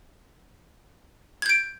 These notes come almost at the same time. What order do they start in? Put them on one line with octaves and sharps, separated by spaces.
G#6 G6 D7